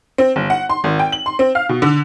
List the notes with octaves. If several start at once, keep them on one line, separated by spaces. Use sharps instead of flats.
C4
G1
F#5
C6
G#1
G5
F#7
C6
C4
F5
B2
D3